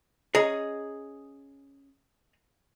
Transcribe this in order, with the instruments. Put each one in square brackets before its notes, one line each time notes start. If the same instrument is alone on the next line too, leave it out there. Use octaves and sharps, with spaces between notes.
[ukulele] C#4 C#5 D#5 [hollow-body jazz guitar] G#4 A#5